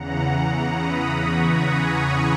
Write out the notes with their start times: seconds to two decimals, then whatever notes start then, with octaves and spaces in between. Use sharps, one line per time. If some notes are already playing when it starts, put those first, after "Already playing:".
Already playing: E2 C#3 E3 F#5 A#5
0.79 B5 D#6
1.22 A#5 C#6
1.65 G#5 B5
1.94 A#5 C#6